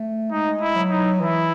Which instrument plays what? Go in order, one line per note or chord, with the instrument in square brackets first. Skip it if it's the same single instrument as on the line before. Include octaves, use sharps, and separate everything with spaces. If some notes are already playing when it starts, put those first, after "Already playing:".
Already playing: [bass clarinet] A3
[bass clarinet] G#3 [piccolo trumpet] D#4
[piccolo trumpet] E4
[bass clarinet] F#3
[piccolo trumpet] D#4
[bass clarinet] E3 [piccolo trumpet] E4